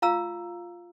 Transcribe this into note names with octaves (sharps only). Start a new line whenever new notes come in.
F4 F5 A#5 E6